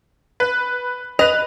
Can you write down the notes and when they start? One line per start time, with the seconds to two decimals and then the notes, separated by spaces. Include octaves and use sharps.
0.40 B4
1.19 B4 D#5 F7